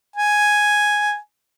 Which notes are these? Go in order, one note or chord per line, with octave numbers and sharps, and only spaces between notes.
G#5